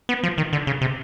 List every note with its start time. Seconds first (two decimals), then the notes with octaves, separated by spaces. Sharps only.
0.09 B3
0.23 F3
0.38 D#3
0.53 D3
0.67 C#3
0.81 C3